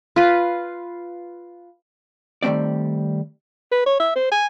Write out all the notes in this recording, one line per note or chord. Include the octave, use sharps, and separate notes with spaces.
F4 B4
D#3 G3 A3 C4 D5
B4
C#5
E5
C5
G#5